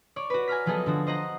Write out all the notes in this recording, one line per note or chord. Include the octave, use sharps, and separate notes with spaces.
C#5 D5 C#6
F#4 B4
G#5 A#5 F6 B6
F3 F#3 B3 G#4 A4 D#5
D3 F3 F#4
C5 D#5 F#5 A#5